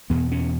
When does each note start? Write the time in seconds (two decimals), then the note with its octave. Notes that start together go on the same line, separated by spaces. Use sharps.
0.10 E2 B2 B3
0.32 C#4